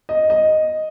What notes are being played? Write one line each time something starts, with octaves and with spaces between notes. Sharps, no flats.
D#5
D#5